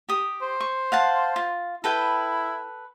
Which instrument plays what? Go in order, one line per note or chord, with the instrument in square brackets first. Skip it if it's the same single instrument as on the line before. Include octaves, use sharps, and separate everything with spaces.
[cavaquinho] G4 D#6
[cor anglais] C5
[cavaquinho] C#6
F5 F#5 A5
F4
[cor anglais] E4 [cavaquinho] A4 B4 G5